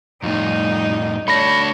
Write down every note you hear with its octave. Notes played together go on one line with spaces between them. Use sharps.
F2 A2 G3 D#4
A3 D4 C#5 B5 A#6